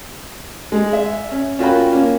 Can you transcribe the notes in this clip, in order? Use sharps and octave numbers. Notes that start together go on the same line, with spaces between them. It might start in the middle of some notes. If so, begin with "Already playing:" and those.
G#3
E5
C#4
C#4 F4 F#4 A#4 G5 B5
A#3 C#4